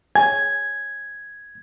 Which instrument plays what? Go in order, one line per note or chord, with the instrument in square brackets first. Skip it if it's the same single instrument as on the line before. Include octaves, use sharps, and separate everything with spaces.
[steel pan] G#5 [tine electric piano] G#6